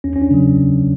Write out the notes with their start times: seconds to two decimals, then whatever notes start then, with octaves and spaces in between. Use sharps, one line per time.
0.04 E2 C#4
0.16 C#4
0.22 D4
0.31 C#3 F#3